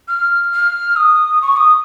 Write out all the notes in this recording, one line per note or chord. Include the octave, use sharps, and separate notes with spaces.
F6
F6
D#6
C#6
D#6